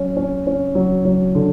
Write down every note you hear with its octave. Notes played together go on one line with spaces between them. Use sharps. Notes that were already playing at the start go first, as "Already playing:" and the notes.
Already playing: F#3 C#4
C#4
C#4
F#3
F#3
D3